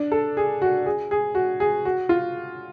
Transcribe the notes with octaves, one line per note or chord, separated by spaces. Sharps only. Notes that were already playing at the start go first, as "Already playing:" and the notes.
Already playing: D4
A4
G#4
F#4
G#4
G#4
F#4
G#4
F#4
F4